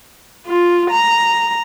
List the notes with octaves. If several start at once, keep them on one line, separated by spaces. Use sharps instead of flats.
F4
A#5